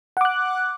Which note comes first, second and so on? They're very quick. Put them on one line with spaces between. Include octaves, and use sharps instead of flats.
F#5 D6 F#6